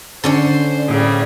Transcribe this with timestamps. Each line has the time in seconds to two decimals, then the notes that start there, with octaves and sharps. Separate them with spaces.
0.24 D3 C#4 C5 D5
0.87 A2 C#3 G3